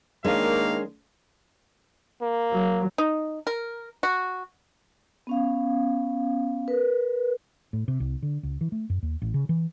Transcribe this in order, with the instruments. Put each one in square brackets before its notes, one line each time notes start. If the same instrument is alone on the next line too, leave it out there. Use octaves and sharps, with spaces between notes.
[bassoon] D#3 [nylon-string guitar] G#3 C#4 D4 [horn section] A#3 [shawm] F5
[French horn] A#3
[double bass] F#3
[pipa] D#4
A#4
F#4
[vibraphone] B3 C#4 F5
A#4 B4
[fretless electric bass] A2
C3
C2
D3
C#2
E3
A3
F#2
D#2
A1
C#3
E3